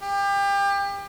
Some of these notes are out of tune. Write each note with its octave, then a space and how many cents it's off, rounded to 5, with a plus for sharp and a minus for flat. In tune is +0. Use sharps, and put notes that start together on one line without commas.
G4 +30